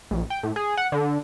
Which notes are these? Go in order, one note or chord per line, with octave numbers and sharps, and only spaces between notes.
A#1
G5
A2
G#4
F#5
D3